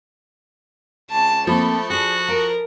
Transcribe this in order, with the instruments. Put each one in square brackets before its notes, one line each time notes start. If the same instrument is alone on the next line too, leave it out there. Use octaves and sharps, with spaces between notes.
[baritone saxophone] C#2 [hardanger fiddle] A5
[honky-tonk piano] F3 B5 [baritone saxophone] A3 [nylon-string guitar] A#3 C4 [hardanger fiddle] A4
[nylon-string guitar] D4 G#4 [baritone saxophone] F#4
[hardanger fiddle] A#4 [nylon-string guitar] F5